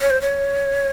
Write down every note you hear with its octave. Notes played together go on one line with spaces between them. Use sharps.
C#5
C5
C#5